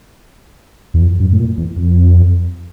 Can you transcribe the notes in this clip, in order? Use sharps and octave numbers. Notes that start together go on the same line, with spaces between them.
E2
F2
F#2
A2
A#2
E2
F2